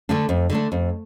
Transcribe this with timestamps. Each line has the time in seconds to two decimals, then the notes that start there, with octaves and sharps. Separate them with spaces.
0.09 D3 A3 D4
0.29 F2
0.50 D3 A3 D4
0.72 F2